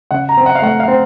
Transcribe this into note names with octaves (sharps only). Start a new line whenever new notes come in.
C#3 F#5
A#5
C4
F#5
F5
A3 F#5
F5
C4